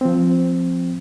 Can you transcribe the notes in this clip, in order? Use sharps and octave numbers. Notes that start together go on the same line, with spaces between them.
F3 C4